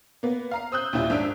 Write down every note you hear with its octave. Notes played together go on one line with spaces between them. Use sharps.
A#3 B3
F5 A#5 C7
C5 D#6 E6 F#6 G6
D#2 A#2 G3 E4 G6
G#1 D4 E6 D7